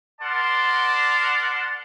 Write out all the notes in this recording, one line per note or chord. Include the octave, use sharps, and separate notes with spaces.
A#4 D5 F#5 A5 C6